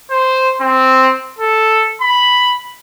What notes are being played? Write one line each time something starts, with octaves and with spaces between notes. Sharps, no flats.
C5
C4
A4
B5